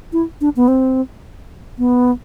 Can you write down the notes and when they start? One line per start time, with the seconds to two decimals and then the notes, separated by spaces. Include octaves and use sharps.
0.13 E4
0.41 D4
0.56 B3
0.68 C4
1.78 B3